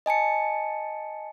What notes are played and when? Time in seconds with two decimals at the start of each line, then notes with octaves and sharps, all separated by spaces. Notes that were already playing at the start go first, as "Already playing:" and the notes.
0.06 D#5 G#5 A5 C#7